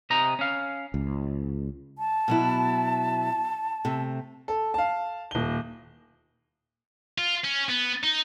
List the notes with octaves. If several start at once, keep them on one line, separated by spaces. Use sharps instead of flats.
C3 D#5 A#5
C#4 F5
C#2
A5
B2 F#3 E4
C3 A3
A4
F5 A5
D#1 G7
F4
C#4
B3
D#4